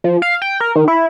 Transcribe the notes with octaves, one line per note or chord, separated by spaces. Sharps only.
F3
F5
G5
A#4
D#3
E4